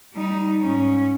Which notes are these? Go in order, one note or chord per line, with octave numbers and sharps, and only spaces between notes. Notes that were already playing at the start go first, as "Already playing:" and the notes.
G3 D#4
G#2 C#4